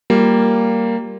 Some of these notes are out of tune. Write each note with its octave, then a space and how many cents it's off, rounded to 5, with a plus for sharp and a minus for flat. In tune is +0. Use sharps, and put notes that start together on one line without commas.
G3 +0 A#3 -5 F4 +0